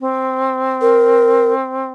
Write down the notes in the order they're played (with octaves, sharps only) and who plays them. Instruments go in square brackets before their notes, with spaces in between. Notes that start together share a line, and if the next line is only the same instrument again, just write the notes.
[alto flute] C4
[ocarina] A#4